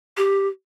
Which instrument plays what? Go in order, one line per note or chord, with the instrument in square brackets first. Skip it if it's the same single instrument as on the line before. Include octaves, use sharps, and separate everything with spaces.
[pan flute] G4